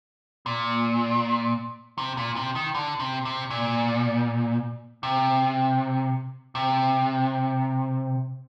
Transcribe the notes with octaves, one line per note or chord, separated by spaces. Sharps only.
A#2
C3
A#2
C3
D#3
D3
C3
C3
A#2
C3
C3